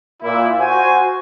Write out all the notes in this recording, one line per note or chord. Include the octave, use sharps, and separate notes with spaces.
A#2 E4
F#4 C5 G#5